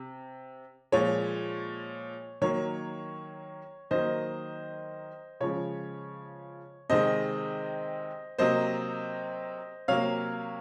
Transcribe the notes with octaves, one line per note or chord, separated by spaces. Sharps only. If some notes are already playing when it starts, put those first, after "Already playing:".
Already playing: C3
A#2 F3 G#3 C#5
D#3 F#3 A#3 C#5
D#3 F#3 A#3 C5 D#5
C#3 F3 G#3 C#5
C3 D#3 G#3 C5 D#5
C3 F#3 A#3 C5 D#5
C3 F#3 A#3 C#5 F5